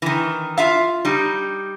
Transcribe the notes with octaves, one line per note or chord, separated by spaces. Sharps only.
D#3 E3
F4 E5 F5
G3 D#4